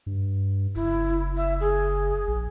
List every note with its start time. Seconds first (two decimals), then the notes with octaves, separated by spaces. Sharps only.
0.06 G2
0.75 F#1 E4
1.37 E5
1.61 G#4
2.27 A#1